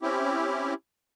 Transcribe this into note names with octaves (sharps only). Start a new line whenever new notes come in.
C4 C#4 E4 G4